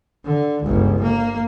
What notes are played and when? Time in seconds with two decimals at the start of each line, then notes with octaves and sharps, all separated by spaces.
0.25 D3
0.63 G1 C#2
1.02 A#3